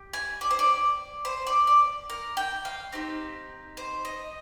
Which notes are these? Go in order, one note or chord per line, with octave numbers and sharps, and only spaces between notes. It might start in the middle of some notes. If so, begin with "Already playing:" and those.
Already playing: G4
G#5
D5
C5
D5
C5
D5
D5
A#4
G5
F5
C4 D#4 G4
C5
D#5